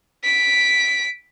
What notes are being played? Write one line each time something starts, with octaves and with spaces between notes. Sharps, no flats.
B6 D7